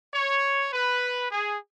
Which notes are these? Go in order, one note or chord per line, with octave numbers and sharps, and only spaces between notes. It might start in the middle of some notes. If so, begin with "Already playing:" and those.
C#5
B4
G#4